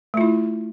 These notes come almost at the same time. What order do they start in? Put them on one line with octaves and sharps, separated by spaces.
A3 F4 E4